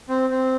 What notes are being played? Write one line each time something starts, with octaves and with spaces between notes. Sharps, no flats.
C4
C4